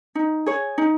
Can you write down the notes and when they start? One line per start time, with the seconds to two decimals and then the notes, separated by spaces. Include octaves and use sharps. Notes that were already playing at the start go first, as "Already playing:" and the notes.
0.15 D#4
0.46 G#4 C#5
0.78 D#4